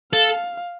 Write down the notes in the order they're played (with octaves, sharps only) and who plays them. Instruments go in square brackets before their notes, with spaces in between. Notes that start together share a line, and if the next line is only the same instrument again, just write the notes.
[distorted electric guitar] A4 [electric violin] F5